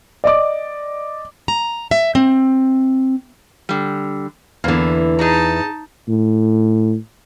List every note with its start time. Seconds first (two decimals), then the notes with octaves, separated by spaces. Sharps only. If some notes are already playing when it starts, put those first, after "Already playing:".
0.24 D5 D#5 D6
1.48 A#5
1.91 E5
2.15 C4
3.69 D3 G3
4.64 E2 D3 E3 A#3
5.19 D#4 G#4 A5 A#5
6.08 A2